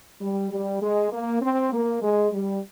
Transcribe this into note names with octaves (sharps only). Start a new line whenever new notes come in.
G3
G3
G#3
A#3
C4
A#3
G#3
G3